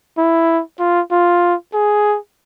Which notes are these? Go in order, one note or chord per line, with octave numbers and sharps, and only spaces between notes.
E4
F4
F4
G#4